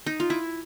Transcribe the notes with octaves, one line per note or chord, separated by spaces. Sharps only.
D#4
F4
E4